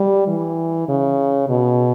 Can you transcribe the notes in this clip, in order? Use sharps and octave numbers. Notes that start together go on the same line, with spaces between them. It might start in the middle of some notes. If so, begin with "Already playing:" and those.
Already playing: G3
E3
C#3
B2